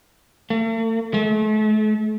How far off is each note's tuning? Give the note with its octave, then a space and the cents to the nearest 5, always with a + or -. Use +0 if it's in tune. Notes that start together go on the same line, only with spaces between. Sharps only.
A3 +40
A3 -40